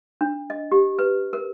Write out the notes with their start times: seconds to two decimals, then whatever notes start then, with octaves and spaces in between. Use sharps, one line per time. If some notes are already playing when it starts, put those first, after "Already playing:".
0.21 D4
0.50 D#5
0.72 G4
0.99 B4
1.33 A#4